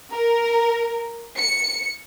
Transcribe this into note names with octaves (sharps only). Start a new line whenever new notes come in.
A#4
C#7